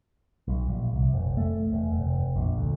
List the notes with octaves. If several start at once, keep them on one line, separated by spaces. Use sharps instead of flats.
B1
A#1
C2
F1
A3
E1
F1
A#1
D2